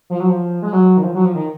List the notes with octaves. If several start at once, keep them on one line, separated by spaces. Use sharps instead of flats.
F3
F#3
F3
G#3
F#3
D#3
F3
F#3
F3
D#3